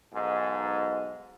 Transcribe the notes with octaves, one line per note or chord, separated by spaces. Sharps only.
B1 G#2